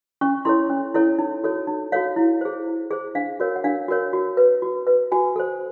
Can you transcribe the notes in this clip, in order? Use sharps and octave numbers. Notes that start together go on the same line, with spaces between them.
C#4 C#6
E4 A4 C#5 C6
C#4
E4 A4 C#5
D#4
F#4 A4 C#5
D#4
F#4 A4 C#5 F5
E4
G#4 C5
E4
G#4 C5
D4 F5
F#4 A#4 C#5
F#5
D4 F5
F#4 A#4 C#5
F#4
B4
F#4
B4
F#4 G#5
A4 C5